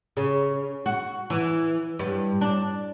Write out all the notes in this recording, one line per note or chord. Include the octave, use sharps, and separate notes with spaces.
C#3
F#4
E3
G2
D4